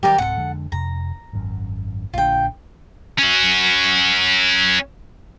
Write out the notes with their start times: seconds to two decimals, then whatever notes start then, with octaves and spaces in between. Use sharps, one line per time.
0.03 D#3 F#3 G3 G4 A#4 D5
0.18 C2 G#2 C4 A4 F#5
0.38 F2 D3 G#3
0.72 F2 C3 A#5
1.33 G#1 F#2
2.14 A#1 A#2 D3 F4 G5
3.19 C#4 F#4